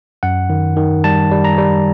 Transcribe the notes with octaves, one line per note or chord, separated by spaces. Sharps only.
F#2 F#5
D#3
D#3
G3 A5
G3
A#5
G3